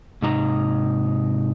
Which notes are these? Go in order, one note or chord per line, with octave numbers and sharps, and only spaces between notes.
G#2 C3 D#4 A#5